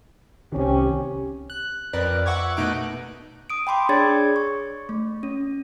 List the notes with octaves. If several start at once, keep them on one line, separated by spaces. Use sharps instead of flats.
C2 D#3 C4 C#4 G4
F#6
F2 A#4 B4 D5 F#6
E5 F#5 C#6 D6 G#6
B2 A3 D#4 F#6 D7
D#6 D7
G5 B5 C6 D6
D4 G#4 C#5 D5 G#6 A6
C#6
A3
C#4